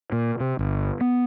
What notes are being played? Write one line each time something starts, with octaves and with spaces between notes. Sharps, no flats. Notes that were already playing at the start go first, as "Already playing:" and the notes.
A#2
C3
G1
B3